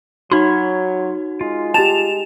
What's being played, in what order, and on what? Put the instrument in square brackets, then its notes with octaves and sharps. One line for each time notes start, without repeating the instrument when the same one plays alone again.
[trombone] F#3 [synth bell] D#4 F#4 [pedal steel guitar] C#5 B5 C6
[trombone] G#3 [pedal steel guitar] F4
[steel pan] G4 A5 [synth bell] E7 F7